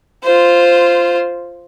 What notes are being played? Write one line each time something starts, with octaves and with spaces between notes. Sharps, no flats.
F4 C5